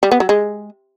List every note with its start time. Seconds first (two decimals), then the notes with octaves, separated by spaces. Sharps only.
0.03 G3
0.12 B3
0.20 F#3
0.29 G#3